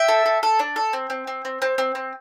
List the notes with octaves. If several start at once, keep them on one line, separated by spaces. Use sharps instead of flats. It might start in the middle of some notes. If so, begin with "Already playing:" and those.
Already playing: E5 G5
A4
A4
A4
D4
A4
C4
C4
C4
C4
C4
C4
C4